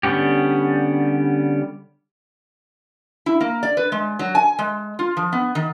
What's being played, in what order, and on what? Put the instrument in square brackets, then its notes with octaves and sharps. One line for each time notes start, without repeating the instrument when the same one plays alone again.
[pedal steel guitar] D3 G3 B3 C#4 G4
[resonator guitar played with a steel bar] E4
A#3
D5
B4
G#3
F#3
G#5
G#3
F4
F3
B3
D#3